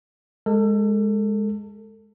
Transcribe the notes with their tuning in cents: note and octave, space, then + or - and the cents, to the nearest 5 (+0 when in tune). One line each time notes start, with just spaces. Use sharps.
G#3 +0 A4 +30